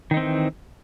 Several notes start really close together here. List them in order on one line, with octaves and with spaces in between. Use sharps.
D#3 D#4 C4 E3